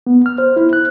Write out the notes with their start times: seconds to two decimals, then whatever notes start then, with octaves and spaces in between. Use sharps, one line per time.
0.07 B3
0.26 F6
0.38 C5
0.56 E4
0.73 F#6